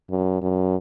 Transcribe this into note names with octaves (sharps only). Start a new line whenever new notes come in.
F#2
F#2